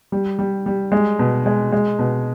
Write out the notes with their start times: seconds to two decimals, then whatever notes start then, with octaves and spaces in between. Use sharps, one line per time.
0.12 G3
0.39 G3
0.66 G3
0.92 G#3
1.19 B2
1.46 G#3
1.73 G#3
1.99 B2